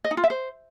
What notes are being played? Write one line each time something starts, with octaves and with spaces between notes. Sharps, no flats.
D#5
D#4
F4
E5
C5